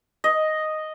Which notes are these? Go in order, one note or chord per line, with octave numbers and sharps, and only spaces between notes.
D#5